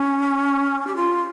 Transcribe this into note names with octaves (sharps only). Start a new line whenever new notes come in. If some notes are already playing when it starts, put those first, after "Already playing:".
Already playing: C#4
G4
F4